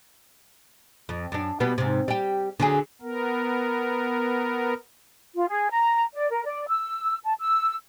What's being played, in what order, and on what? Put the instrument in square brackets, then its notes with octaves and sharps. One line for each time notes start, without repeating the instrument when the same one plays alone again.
[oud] F2
F#2 D4
B2 G3 B3
G#2 C3
G3 G4
D3 F#3 G#4
[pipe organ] B3 A#4
[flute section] F4
G#4
A#5
D5
A#4
D5
E6
A5
E6